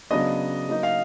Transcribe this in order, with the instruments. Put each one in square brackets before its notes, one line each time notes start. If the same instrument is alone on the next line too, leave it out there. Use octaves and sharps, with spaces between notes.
[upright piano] C#3 F#3 B3 D4 [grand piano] D#5
[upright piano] F#3 A#3 D#4
[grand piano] F5